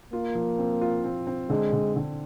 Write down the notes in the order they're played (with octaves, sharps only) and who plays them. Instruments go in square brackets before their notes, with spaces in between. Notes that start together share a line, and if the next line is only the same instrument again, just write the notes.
[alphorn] A#3 [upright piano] F4
[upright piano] F3
C4
F4
C4
C4
[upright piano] D3 [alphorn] G#3
[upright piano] D3
D3